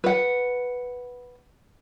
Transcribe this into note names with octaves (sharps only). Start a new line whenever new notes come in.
B4 F#5